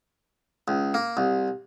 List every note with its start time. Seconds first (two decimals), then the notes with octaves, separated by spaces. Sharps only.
0.68 C#2
0.94 A#3
1.17 C2